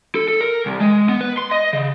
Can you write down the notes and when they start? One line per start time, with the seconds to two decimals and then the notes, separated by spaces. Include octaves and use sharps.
0.15 A4
0.28 A4
0.41 A#4
0.66 C2
0.80 G#3
1.09 B3
1.21 B4
1.38 C6
1.51 D#5
1.73 C#3